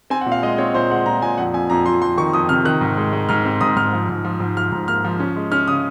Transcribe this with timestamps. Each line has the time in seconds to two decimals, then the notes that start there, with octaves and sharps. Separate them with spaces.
0.10 C4 G#5
0.21 F#5
0.26 A#2
0.32 F5
0.43 G#3 D#5
0.58 C4 C#5
0.74 A#2 C5
0.91 G#3 F#5
1.06 A#2 A#5
1.22 A#2 G#5
1.38 F2 F#5
1.54 F2 G#5
1.70 F2 A#5
1.86 F2 C6
2.02 F2 C6
2.17 D#3 C#6
2.33 F2 D#6
2.49 C3 F6
2.65 D#3 F#6
2.81 G#2
2.97 G#3
3.13 G#3
3.29 G#2 F6
3.45 C4
3.61 G#2 D#6
3.76 G#2 F6
3.93 F3
4.09 G#2
4.24 F3
4.40 G#2
4.57 F3 F6
4.72 G#2
4.88 A#3 F6
5.04 F3
5.20 C#4
5.36 G#3
5.52 C#4 F6
5.68 C#3 D#6